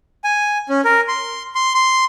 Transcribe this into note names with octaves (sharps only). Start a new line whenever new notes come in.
G#5
C#4
A#4
C6
C6
C6